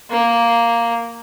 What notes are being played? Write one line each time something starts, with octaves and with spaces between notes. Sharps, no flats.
A#3